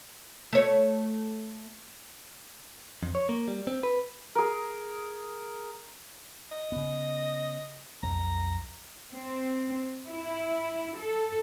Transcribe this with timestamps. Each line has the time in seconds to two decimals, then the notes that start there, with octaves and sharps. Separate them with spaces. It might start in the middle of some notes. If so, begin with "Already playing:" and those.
0.53 A3 C#5
3.03 F2
3.15 C#5
3.29 A#3
3.48 G3
3.67 C4
3.83 B4
4.35 G#4 A#4
6.52 D#5
6.72 C#3 B3
8.03 B1 F2 A#5
9.13 C4
10.09 E4
10.99 A4